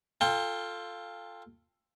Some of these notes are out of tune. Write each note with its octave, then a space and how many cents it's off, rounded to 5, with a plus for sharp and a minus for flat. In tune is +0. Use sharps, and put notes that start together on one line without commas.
F4 +0 A4 +10 G5 +30